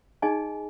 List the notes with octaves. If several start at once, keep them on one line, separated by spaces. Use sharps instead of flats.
D#4 G#4 D#5 G#5